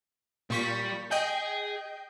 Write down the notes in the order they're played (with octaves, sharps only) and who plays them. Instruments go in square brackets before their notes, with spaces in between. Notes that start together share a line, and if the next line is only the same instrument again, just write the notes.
[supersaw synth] A#2 C#6 B6 [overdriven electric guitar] G3
[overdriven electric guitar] G#4 [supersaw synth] D#5 G5 G6